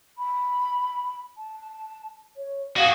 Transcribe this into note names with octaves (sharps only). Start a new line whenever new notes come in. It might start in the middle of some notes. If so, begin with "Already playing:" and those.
B5
A5
C#5
F#4 G#4 F5